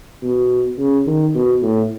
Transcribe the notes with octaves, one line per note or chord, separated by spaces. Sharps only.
B2
C#3
D#3
B2
A2